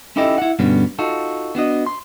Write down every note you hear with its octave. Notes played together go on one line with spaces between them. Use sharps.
C#4 D#4 E4 G4 A4 D#5
E4 F#5
G2 B2 D3 G3 B3 C#4
D#4 F4 F#4 A4
B3 D4 F#4 D#5
C6